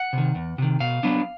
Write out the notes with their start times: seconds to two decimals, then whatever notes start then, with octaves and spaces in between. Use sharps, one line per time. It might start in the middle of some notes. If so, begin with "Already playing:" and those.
Already playing: F#5
0.13 C3 D#3
0.35 E2
0.58 C3 D#3
0.80 B2 F5
1.03 F#3 B3 D4